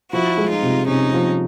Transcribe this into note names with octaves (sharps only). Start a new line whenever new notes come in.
F3 E4 F#4
G#3
D#4 F4
C3
C3 C#4 D#4
F3